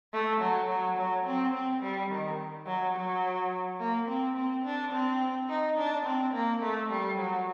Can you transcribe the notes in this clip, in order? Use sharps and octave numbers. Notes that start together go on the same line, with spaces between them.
A3
F#3
F#3
F#3
C4
C4
G3
D#3
F#3
F#3
A#3
C4
C4
D4
C4
D#4
D4
C4
A#3
A3
G3
F#3